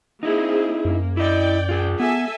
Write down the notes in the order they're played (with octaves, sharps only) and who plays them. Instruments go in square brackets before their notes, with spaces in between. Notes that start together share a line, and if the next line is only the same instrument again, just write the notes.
[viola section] A#3 C4 G#4 [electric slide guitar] D#4 E4
[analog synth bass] F#2 [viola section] A#3
[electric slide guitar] E4 D#5 [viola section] D5 G5
[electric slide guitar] F4 G#4
[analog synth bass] B3 [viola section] A4 E5 G#5